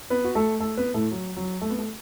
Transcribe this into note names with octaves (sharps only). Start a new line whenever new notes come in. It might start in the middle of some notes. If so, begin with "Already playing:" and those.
B3 B4
F#4
A3 A4
A3 A4
B3 B4
A2 A3
F#3
F#3
A3
B3
A3